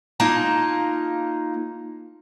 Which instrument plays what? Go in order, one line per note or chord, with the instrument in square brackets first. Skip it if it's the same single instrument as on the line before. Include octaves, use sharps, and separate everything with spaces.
[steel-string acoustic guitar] A#3 D#4 F4 A5